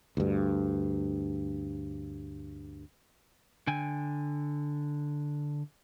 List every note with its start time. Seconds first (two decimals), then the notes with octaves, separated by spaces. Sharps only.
0.17 D2 G2
3.67 D3 G5 G#5